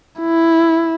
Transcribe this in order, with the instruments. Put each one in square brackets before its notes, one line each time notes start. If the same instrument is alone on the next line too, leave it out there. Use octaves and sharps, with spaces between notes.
[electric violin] E4